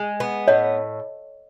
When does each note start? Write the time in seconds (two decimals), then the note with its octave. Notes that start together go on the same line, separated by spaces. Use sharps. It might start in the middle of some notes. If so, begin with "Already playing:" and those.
Already playing: G#3
0.20 B3
0.48 A2 C#5 D#5